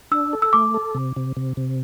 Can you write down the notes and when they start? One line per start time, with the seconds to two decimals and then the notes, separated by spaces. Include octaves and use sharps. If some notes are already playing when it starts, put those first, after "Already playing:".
0.11 D4 E6
0.33 A4
0.42 E6
0.53 A3 D6
0.74 A4
0.95 C3
1.16 C3
1.37 C3
1.57 C3